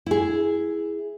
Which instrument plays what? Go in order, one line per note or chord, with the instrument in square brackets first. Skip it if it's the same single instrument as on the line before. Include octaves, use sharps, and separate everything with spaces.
[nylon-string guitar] E4 G#4